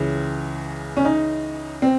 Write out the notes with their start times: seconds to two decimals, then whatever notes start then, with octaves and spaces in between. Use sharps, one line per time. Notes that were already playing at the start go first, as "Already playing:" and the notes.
Already playing: C#2 C#3 E3
0.97 C#4
1.05 D#4
1.82 C4